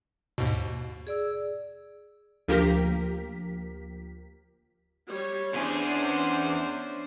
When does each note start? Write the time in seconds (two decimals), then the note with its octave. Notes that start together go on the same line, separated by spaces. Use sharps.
0.38 D#2 G#2 B2
1.07 G#4 D5 E6
2.48 D2 F3 A#3 G4 A#4 B6
5.09 G3 C#5
5.54 E2 C#4 D4 G#4 C5